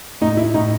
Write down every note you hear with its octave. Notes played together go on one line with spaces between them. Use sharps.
A2 D#4
E4
A2 D#4